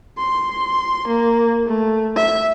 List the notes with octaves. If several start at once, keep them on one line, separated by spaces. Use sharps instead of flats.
C6
A#3
A3
E5